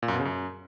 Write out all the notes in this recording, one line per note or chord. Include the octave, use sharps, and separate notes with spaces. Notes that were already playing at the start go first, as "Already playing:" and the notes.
A#2
F#2
B2
C#3
F#2